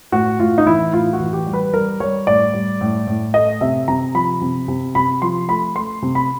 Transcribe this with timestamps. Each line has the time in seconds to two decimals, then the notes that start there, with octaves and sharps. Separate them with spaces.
0.12 A2 F#4
0.39 A2 F4
0.58 D#4
0.66 E3 E4
0.93 A2 F4
1.13 F#4
1.20 E3
1.33 G4
1.47 G3
1.53 B4
1.73 G3 A#4
2.00 G3 C#5
2.27 A2 D5
2.54 G3
2.81 A2
3.07 A2
3.34 A3 D#5
3.61 C3 E5
3.88 C3 A#5
4.15 F3 B5
4.41 C3
4.68 C3
4.95 C3 B5
5.22 F3 C6
5.48 A3 B5
5.76 A3 C6
6.02 C3
6.15 B5